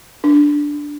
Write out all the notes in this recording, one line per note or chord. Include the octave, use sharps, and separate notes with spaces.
D4